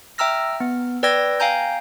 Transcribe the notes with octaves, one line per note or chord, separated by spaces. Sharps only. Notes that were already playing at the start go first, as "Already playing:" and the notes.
E5 G5 A#5 E6 F6 A#6
B3
B4 D5 G5 E6 G#6 A#6
F5 G5 G#5 A#5 G6